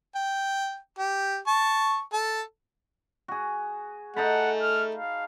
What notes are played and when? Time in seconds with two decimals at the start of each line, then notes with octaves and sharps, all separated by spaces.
0.15 G5
0.98 G4
1.47 A5 C#6
2.13 A4 A5
3.28 F#4 G#4
4.16 A3 D#4 F#5 A5 B5
4.62 F6
4.95 F5